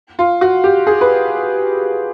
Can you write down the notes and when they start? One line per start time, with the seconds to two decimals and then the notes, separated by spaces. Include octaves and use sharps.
0.19 F4
0.41 F#4
0.64 G4
0.87 G#4
1.01 B4